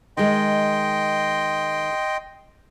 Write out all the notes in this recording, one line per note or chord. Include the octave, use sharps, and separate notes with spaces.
D#3 G#3 D#5 G5 C6